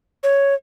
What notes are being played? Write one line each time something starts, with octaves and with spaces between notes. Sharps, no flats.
C#5